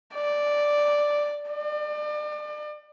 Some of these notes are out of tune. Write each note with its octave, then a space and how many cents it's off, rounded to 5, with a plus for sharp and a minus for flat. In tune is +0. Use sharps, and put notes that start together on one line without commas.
D5 +0
D5 +35